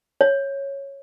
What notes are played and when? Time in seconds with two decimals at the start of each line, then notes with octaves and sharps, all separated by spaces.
0.21 C#5